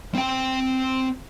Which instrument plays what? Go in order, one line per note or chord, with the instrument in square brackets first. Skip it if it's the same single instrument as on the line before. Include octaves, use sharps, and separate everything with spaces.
[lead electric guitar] C4 G5